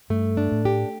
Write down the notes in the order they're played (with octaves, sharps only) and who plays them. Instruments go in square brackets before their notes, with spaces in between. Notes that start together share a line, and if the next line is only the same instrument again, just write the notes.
[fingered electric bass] G2 [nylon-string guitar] A3
[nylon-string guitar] D4
[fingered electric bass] A2
[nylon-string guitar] G4